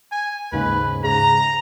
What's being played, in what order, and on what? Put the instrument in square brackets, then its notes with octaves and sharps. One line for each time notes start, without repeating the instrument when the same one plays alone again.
[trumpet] G#5
[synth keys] D#2 G#2 C#3 [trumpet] B4
[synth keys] G#2 C#3 [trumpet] A#5